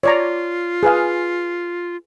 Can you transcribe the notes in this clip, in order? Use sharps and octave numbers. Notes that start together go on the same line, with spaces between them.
F4 C#5 D5 A#5
G#4 B4 F5